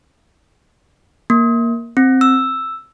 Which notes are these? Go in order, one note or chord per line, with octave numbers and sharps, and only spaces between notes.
A#3
C4
E6